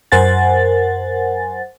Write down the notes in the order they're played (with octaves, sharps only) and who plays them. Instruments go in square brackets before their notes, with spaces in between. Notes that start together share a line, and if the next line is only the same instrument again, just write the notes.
[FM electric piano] F#2 A#4 C5 F#5 G#5 A6